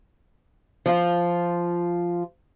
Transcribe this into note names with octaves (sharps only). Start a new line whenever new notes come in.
F3 F4